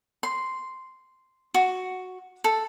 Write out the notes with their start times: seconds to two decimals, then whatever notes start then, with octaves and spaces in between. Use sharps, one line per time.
0.23 C6
1.54 F#4
2.44 A4